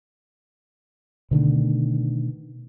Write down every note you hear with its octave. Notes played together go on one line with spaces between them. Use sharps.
B2 D3 D#3 A3